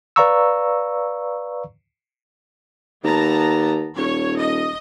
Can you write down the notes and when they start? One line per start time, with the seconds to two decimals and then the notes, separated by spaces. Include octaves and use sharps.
0.16 B4 D5 F5 A#5 C#6 E6
3.04 D#2 B3 A5 A#5
3.96 D#1 C#5
4.39 D#5